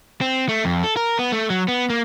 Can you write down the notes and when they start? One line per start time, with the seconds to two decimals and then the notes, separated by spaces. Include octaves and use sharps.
0.21 C4
0.49 A3
0.65 F2
0.84 A4
0.97 A#4
1.19 B3
1.32 A3
1.50 F#3
1.68 B3
1.90 A#3